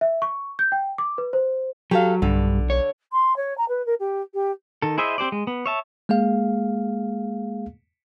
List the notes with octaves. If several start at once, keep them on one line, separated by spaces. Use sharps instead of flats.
E5
C#6
G6
G5
D6
B4
C5
F#3 G4 A4 F5
B1 G2 D3
C#5
C6
C#5
A#5
B4
A#4
G4
G4
D#3 A4
E4 G#4 C5 D#5 E5
C4 G4 C5 D5
G#3
B3
C#5 E5 A5
G#3 A#3 G#4 F5